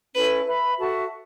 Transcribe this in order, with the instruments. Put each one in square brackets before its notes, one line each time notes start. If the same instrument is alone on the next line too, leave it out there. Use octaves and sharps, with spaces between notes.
[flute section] C#4 E4 A4 E5 [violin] B4
[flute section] B4 E5 B5
F#4 A4 E5 A5